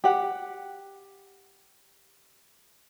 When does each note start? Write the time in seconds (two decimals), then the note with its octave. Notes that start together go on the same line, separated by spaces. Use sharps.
0.04 G4 F#5